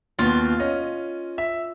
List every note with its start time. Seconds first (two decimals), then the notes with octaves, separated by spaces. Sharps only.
0.19 D#2 B2 B3 F4
0.59 C#4 D#5
1.38 E5